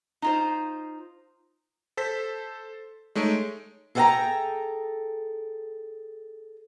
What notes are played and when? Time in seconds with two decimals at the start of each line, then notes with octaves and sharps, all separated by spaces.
0.22 D#4 F4 C5
1.97 A4 C5 B6
3.15 G#3 A3 D#4 C#5 D7
3.95 G#4 A4 C5 F#5 G5 A#5